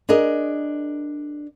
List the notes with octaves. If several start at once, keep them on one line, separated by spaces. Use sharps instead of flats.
D4 G#4 A#4 D#5